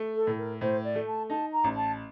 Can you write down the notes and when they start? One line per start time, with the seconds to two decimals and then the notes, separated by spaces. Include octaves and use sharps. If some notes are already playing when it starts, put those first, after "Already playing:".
Already playing: A3
0.15 A4
0.27 A2
0.38 A#4
0.61 A2 C5
0.84 D5
0.95 A3
1.07 A5
1.30 D#4 A5
1.52 A#5
1.64 A1
1.76 A5